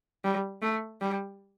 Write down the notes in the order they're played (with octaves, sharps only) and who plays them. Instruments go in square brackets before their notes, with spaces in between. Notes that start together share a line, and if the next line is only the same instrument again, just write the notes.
[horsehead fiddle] G3
A3
G3